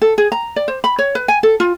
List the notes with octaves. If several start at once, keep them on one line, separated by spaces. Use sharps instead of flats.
A4
G#4
A#5
D5
C5
B5
C#5
B4
G#5
A4
F4